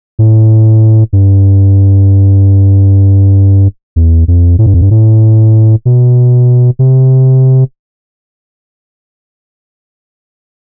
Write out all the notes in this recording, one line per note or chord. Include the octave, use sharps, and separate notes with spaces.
A2
G2
E2
F2
A2
G2
F2
G2
A2
B2
C3